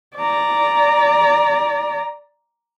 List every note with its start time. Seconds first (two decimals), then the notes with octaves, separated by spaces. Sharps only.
0.16 D5 A#5